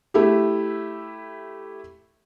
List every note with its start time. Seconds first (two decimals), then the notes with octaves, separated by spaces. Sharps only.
0.14 A3 E4 G4